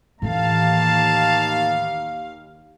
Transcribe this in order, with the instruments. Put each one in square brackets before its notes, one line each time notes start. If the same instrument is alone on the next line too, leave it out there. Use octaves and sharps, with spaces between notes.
[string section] D#2 F5 [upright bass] A2 E3 [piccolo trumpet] A5